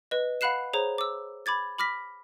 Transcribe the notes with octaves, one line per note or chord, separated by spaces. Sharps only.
B4 D#5
F5 F#5 B5 F#6 C7 E7
G#4 C5 C#5 A#5
D6 E6
B5 D6 G#6 A6
B5 D6 F6 A#6 B6